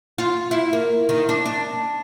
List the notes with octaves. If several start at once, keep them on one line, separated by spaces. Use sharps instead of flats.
F4
E4
A#3
D#3
D4
D4